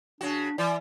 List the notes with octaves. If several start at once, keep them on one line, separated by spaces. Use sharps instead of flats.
C#3 D4 F#4
E3 D5